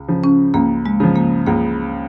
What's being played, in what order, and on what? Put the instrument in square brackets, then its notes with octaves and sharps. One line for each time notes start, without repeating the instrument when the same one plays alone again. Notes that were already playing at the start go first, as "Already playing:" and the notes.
Already playing: [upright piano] C#2
C#3 F3
[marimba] C#4
[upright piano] C#2 [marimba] A#3
[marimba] G#3
[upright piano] C#3 F3
[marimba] A#3
[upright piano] C#2 [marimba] A#3